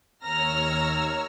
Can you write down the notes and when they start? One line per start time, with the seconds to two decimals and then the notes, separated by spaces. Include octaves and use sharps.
0.22 D#2 C#5 A#5 E6 F6 A#6